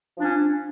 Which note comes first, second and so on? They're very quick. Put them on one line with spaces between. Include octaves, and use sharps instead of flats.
F3 D4 C#4